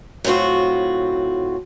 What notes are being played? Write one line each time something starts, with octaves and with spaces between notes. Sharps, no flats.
A2 F#3 C4 F4 F#4